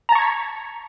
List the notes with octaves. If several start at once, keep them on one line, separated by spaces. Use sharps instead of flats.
A5 A#5 C#6 G#6 B6